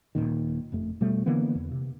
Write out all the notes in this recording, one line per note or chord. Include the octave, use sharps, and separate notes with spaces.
D#1 A#1 A#2 D#3
F#1 F2 A3
B2 G3 A3
D3 E3 A#3 B3
E2
C3